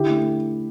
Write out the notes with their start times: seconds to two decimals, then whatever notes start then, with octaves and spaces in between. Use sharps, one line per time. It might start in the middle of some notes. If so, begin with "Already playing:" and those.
Already playing: D3 E4 G4
0.10 A3